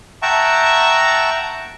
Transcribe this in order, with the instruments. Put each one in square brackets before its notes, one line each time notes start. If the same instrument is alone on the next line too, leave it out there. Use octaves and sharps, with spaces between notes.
[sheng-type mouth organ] E5 F#5 G5 A5 A#5 C#6